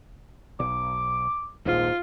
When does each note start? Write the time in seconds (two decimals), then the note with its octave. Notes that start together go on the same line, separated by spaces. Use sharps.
0.60 B1 D6
1.66 D#1 A#1 G#2 F4